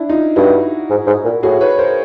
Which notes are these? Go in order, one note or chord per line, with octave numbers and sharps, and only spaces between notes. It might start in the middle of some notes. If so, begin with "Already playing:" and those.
Already playing: D4 E4
D#4 F4
G2 E4 F#4
G#2
G#2
A#2
A2 F#4 G#4
B4 C#5
A#4 C5